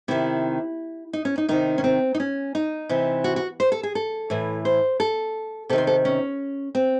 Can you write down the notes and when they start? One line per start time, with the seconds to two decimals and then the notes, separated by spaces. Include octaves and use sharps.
0.08 C3 D#3 E4
1.13 D#4
1.25 C#4
1.38 D#4
1.49 C3 D#3 D#4
1.78 C#4
1.84 C4
2.14 D#4
2.20 C#4
2.55 D#4
2.89 C3 E3
3.24 F#4
3.36 F#4
3.60 C5
3.72 A4
3.83 G#4
3.95 A4
4.30 A2 E3
4.65 C5
5.00 A4
5.69 C3 D#3 A4
5.78 C5
5.87 A4
6.05 C#4
6.75 C4